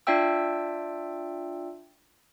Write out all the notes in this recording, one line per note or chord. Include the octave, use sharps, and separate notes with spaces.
D4 F4 D5 E5 G5 E6